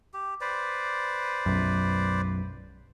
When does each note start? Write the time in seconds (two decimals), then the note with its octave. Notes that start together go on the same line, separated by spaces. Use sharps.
0.14 G4
0.41 B4 C5 D5
1.46 B1 F#2